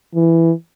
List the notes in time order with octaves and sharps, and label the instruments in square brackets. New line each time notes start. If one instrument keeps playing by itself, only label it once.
[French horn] E3